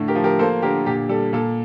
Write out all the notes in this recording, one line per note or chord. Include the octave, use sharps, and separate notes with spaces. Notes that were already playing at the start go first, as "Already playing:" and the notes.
Already playing: A2 D3
G4 A#4
F3
G4 A#4
A#3 A4 C5
D3 G4 A#4
A#2 G4
G3 A4
A#2 A4